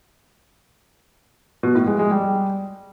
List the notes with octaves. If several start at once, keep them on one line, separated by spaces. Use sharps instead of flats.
B2
A2
G#3
G#3
G3